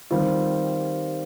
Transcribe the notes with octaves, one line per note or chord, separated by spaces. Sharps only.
D#3 G3 C4 F4